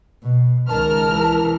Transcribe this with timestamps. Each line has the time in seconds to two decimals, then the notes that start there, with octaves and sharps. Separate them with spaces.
0.23 B2
0.69 C#2 D#3 A#4 A5 F6
1.10 E3